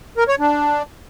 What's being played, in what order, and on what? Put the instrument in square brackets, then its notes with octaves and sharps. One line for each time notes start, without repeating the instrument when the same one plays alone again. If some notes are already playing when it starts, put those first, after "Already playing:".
[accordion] A#4
C#5
D4